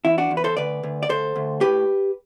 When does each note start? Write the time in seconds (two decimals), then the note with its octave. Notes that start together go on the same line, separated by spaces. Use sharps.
0.05 E2 E4
0.18 D4 F#4
0.31 E2
0.37 B4
0.44 A4 C5
0.57 D2 B4 D5
0.83 D2
1.03 D5
1.09 D2 A4 C5
1.36 D2
1.61 A2 G4 B4